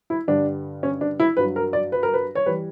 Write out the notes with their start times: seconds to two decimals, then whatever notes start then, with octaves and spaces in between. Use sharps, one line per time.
0.10 E4
0.28 G2 D3 G3 D4
0.83 C#4
1.01 D4
1.20 E4
1.37 G2 F#3 B4
1.56 A#4
1.73 D5
1.92 B4
2.03 A#4
2.14 B4
2.35 C#5
2.46 E3 G3 B4